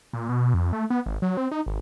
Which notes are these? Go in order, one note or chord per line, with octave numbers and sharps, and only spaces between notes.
A#2
B2
F2
A3
B3
G#1
F#3
C4
D#4
G#1